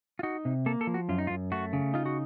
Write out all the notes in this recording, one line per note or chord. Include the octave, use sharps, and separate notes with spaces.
F4
D#4 F#4
C3
A#3 A4
A4
F3
F#4
F#2 F4
D#4
F4
F#2
A3 F#4
C#3
D#4 F4
F#4